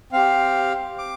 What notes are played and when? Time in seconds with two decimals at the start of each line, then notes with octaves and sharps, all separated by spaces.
0.13 C4 G4 F5
0.98 D6